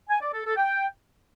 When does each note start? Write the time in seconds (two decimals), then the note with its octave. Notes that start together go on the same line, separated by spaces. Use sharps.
0.09 G#5
0.21 D5
0.32 A4
0.44 A4
0.56 G5